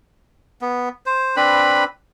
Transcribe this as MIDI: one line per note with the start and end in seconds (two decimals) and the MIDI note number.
0.61 0.89 59
1.06 1.36 72
1.36 1.84 60
1.36 1.84 62
1.36 1.84 71
1.36 1.84 83